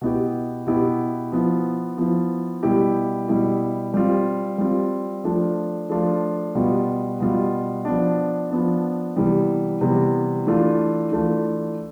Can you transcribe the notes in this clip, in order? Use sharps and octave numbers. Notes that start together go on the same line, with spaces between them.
B2 B3 E4 G4
B2 B3 E4 G4
F3 B3 E4
F3 B3 E4
B2 G3 B3 E4 G4
B2 G3 B3 E4 G4
G3 C4 F4
G3 C4 F4
F3 A3 D4 F4
F3 A3 D4 F4
B2 G3 B3 F4
B2 G3 B3 F4
F3 B3 D4
F3 B3 D4
C3 E3 G3 B3
C3 E3 G3 B3
E3 A3 D4 F4
E3 A3 D4 F4